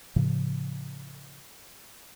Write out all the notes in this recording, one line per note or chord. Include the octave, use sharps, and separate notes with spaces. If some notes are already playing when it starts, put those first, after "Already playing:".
A2 C#3 F3